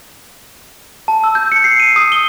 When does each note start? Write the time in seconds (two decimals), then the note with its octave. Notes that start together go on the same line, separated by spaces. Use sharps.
1.08 A5
1.24 E6
1.35 G6
1.52 C#7
1.64 C7
1.80 D#7
1.96 D#6
2.12 G7